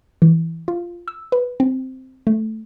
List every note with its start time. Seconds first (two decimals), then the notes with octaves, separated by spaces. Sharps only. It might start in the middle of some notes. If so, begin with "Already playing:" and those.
0.22 E3
0.68 F4
1.08 E6
1.32 B4
1.60 C4
2.27 A3